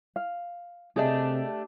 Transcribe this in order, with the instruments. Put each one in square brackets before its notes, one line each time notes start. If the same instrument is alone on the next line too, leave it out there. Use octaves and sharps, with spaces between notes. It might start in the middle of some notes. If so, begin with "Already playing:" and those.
[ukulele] F5
[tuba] C3 [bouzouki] A3 D4 G4 [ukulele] G#4 D#5